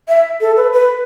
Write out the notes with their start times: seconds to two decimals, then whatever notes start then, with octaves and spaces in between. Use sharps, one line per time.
0.08 E5
0.41 A4
0.57 B4
0.73 B4